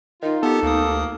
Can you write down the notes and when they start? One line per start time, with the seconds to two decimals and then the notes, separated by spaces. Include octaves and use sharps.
0.23 D#3 D#4 F4
0.43 B3 G4 A4
0.63 D2 A#3 D#6